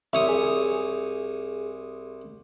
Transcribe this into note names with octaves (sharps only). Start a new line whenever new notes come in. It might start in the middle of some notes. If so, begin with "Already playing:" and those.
C2 C#5 E5 D#6
G#4